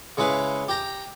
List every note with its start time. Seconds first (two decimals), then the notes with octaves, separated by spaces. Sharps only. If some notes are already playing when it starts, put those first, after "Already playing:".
0.17 C#3 G#3 E4 B4 F5
0.68 G4 G5 A#5